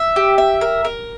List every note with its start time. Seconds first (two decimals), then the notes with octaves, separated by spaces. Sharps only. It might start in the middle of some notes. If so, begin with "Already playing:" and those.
Already playing: E5
0.16 G4
0.38 E5
0.61 A#4
0.85 A#4